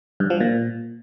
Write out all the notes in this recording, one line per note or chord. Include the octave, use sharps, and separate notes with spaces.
G2
F3
A#2